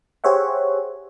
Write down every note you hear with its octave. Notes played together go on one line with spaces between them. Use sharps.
G4 G#4 C5 C#5 E5 F#5